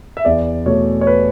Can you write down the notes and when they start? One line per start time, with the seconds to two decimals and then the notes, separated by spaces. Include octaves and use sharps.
0.17 E5
0.25 E2 D5
0.66 B2 A3 C#5
1.01 C#5
1.07 B4